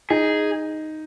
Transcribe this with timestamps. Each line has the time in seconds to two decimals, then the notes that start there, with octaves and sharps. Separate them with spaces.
0.10 D#4 G#4